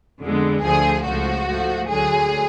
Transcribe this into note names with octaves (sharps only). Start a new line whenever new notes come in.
F2 D3 G#3 B3
D2 D3 F3 A3 G#4
C#2 C#3 F3 A3 F#4
G#2 F3 A3
D2 D3 F#3 G#4